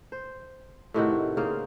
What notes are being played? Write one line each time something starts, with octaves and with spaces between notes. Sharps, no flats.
C5
A2 C3 D#3 F#4
C#3 A#3 C5